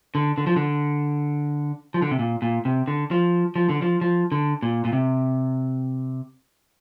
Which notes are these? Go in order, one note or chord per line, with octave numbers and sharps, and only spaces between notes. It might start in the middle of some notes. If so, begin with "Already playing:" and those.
D3
D3
F3
D3
F3
D3
C3
A#2
A#2
C3
D3
F3
F3
D3
F3
F3
D3
A#2
A#2
C3